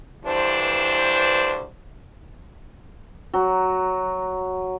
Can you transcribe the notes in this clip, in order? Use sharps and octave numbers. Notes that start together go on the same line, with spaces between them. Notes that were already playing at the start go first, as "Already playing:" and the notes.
D2 G2 E3 D4 C5
F#3